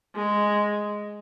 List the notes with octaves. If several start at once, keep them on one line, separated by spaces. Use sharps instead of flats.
G#3